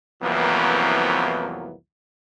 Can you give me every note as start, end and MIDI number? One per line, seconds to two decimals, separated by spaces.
0.23 1.74 36
0.23 1.74 41
0.23 1.74 52
0.23 1.74 54
0.23 1.74 58
0.23 1.74 59